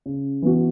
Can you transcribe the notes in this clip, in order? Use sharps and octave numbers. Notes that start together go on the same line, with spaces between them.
C#3
E3 B3 F#4